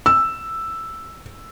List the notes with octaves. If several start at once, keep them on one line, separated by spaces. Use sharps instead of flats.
E6